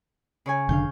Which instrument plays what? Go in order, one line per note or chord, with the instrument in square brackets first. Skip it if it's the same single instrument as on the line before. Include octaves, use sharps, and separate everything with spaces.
[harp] C#3 C#5 G#5
[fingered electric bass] F1 D3 D4 [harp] F5 G6